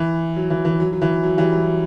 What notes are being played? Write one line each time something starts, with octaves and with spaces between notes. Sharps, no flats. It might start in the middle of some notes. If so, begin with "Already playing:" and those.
Already playing: E3
F#3
E3
E3
F#3
F#3
E3
F#3
E3 G3
F#3